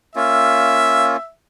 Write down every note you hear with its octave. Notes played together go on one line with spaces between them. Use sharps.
A#3 C#4 F4 E5